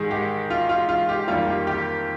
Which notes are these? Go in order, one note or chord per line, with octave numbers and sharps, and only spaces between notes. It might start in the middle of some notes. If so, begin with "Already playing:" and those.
Already playing: G#2 D#3 G#3 G#4
G4
F4
F4
F4
G4
F2 D#3 G3 A#3 F4
G4
G4